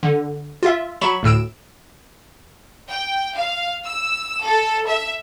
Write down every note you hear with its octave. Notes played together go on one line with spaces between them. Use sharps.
D3
F4 E5
F#3 B5 C#6 E7
D2 A2 E6 D7 E7
G5
F5
E6
A4
E5